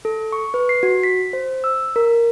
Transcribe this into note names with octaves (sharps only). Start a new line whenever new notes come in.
A4
C#6
B4
C7
F#4
B6
C5
E6
A#4